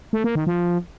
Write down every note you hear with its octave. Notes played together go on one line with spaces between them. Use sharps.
A3
A#3
D#3
F3